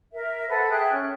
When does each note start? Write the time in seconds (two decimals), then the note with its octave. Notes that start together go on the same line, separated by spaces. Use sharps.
0.13 A#4 E5
0.48 A4 B4 C5 F#5
0.69 G#4 E5 G5 F#6
0.91 C#4